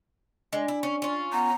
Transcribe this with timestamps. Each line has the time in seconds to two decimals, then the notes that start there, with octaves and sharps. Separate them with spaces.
0.53 G#3 D4 D5 G#5
0.68 E4
0.83 C#4
1.02 C#4 F4
1.33 B3 F#5 A#5